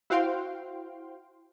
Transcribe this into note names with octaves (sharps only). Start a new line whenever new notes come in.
E4 F#4 C5 F5 G5 C6